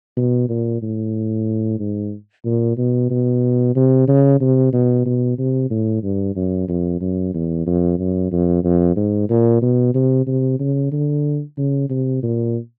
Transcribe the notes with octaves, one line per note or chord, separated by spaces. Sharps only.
B2
A#2
A2
G#2
A#2
B2
B2
C3
C#3
C3
B2
B2
C3
A2
G2
F#2
F2
F#2
E2
F2
F#2
F2
F2
G#2
A#2
B2
C3
C3
C#3
D3
C#3
C3
A#2